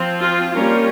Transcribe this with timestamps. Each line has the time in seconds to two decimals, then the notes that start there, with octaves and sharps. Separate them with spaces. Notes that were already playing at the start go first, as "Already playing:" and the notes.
Already playing: F3 C4
0.22 F4
0.53 G3 A#3 C#4 F4 A#4